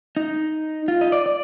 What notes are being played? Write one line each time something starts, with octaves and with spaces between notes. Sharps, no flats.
D#4
F4
D#5
D5
D5